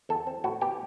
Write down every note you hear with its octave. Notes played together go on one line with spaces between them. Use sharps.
E2 A4
C4
A2 F#4
B3 G4